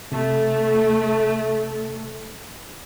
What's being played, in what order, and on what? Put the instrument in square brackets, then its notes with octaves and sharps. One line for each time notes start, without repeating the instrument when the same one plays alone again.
[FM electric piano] C3 [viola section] A3